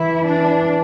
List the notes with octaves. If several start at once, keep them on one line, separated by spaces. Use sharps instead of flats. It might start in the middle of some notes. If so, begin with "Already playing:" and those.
Already playing: E3 E4
D4